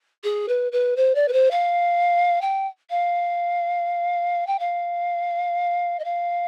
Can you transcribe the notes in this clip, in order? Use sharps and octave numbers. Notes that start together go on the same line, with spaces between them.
G#4
B4
B4
C5
D5
B4
C5
F5
G5
F5
G5
F5
D#5
F5